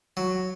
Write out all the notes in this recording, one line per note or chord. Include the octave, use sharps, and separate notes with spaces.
F#3